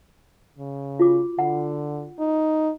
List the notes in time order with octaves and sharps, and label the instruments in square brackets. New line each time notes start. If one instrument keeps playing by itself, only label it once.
[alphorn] C#3
[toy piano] F4 F#4 D6
[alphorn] D3 [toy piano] F#5 B5
[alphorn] D#4